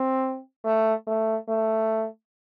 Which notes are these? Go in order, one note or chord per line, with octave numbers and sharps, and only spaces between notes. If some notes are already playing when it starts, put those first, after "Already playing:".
Already playing: C4
A3
A3
A3